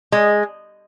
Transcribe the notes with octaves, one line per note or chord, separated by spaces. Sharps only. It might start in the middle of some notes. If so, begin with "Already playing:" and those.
G#3